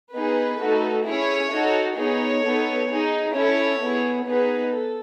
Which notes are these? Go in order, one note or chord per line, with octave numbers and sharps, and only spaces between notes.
B3 D#4 G#4 B4
A3 D#4 F#4 A4
C#4 E4 G#4 C#5
D#4 F#4 A4
B3 D#4 G#4 C#5
B3 D#4 A4
D#4 G#4
C#4 E4 A4 C#5
B3 E4 G#4
B3 D#4 G#4 B4
A4